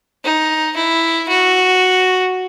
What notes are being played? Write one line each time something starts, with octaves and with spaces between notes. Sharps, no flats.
D#4
E4
F#4